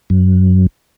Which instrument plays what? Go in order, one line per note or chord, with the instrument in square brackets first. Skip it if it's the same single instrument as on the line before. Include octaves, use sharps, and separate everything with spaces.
[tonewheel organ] F#2